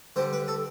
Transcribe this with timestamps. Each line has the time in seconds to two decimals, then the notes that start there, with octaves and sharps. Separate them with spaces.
0.16 D3 G3 C5
0.33 B4
0.48 A4